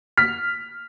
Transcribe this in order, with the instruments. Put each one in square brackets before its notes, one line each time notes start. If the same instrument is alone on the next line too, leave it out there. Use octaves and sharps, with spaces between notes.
[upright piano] F6 B6